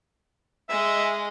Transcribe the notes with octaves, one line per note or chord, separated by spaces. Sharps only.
G#3 D#5 E5